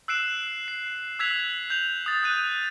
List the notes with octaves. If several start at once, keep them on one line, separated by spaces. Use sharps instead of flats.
E6 F#6 C7 D7 E7
C7
E6 F#6 G#6 B6 F7
G6 F7
D#6 A6
D#6 F#6 G6 D#7